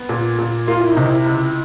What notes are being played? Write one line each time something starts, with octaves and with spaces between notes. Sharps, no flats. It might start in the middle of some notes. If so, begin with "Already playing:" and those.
Already playing: B3
A#2
A#2
A#3 F4
E4
C3 D#4
E4
C#2